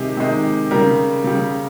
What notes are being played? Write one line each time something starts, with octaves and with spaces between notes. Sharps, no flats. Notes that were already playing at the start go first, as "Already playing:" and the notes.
Already playing: C3 D#3 G#3 G4
C3 D#3 G#3
C#3 G3 A#4
C#3 G3